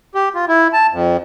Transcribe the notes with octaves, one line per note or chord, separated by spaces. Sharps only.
G4
F4
E4
A5
F2